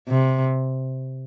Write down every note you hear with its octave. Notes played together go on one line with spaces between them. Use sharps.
C3